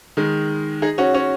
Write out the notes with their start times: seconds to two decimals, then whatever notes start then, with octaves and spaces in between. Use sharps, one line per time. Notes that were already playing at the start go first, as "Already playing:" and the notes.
0.17 D#3 G#3
0.82 D#4 G#4
0.98 C#4 F#4
1.14 C#4 F#4